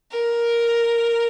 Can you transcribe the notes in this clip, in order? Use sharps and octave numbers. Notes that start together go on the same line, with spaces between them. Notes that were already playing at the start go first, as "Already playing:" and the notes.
A#4